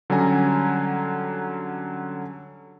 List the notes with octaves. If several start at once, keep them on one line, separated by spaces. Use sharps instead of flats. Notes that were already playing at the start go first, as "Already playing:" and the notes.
D3 F#3 G3 C#4 G#5 A#5